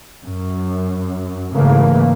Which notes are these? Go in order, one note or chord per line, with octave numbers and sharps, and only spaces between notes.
F#2
G#2 C#3 E3 A3 A#3